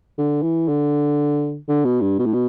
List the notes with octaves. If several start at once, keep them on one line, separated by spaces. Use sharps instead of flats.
D3
E3
D3
D3
B2
G2
B2
A2
B2